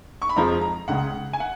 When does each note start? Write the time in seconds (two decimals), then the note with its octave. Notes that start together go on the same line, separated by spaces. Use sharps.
0.22 C#6
0.29 B5
0.36 F2 F3 G#3 A#5
0.61 A#5
0.88 C#2 C#3 G#3 F#5
1.33 G#5
1.40 F#5